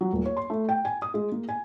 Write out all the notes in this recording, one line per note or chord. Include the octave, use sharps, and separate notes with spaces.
F#3
D#1
C#5
C6
A3
G5
G#5
D#6
G#3
A#3
G#5